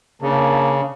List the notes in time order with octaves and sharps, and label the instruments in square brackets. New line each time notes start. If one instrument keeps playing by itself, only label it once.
[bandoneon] C#3 [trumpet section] A#3 D4 A5